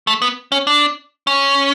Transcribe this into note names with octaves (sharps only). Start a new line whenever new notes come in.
A3
B3
C#4
D4
C#4